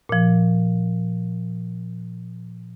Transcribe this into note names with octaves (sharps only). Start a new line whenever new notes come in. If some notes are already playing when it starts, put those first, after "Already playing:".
A#2 F3